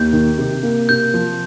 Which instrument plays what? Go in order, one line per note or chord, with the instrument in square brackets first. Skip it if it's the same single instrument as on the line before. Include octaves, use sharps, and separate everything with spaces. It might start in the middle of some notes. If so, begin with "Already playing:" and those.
Already playing: [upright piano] D#2 [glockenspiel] G6
[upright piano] D#3
C3
A#3
[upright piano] C3 [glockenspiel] G6
[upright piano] F3